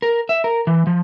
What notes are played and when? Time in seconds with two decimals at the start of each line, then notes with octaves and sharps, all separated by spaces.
0.02 A#4
0.29 E5
0.44 A#4
0.67 E3
0.87 F3